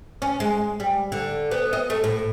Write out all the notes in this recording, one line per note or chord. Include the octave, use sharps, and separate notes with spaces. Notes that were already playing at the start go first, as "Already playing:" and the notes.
C#4
G#3
G3
D3
B3
D#5
A3
A2